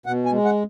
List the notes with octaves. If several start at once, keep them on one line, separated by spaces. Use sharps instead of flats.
B2 F#5
G#5
G#3
F#5